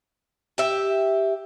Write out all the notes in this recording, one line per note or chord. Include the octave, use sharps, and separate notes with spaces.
G4 E5